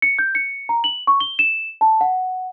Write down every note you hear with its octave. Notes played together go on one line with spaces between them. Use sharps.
C#7
G6
C#7
A#5
F#7
C#6
G7
E7
A5
F#5